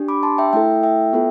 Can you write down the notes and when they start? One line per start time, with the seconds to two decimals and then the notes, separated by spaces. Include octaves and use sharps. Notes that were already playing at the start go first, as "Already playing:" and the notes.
Already playing: D4 G4
0.08 B5 D6
0.23 A5 C6
0.38 E5 G5
0.53 A3 E4 A4 E5 G5
0.83 E5 G5
1.13 B3 F4 A4